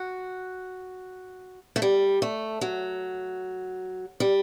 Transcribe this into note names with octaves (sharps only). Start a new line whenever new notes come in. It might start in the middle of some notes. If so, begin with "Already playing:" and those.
Already playing: F#4
A3
G3
A3
F#3
G3